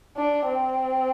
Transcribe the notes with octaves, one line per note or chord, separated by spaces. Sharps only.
D4
C4